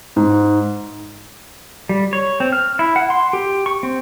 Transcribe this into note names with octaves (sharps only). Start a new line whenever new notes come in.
G#2
G3
C#5
C4
F6
E4
F#5
C6
G4
C#6
C4